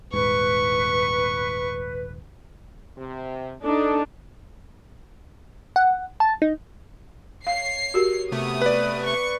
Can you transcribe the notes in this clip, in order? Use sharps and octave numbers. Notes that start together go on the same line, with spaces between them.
D#1 G#2 B4 C#6
C3
D4 D#4 A4
F#5
A5
D#4
C#5 F5 C7
F#4 G4 A#4
C3 A3 B3 D#6
B4 D5
C#6